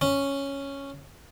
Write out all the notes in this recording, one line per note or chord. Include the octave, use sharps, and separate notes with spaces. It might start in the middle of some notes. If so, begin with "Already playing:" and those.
C#4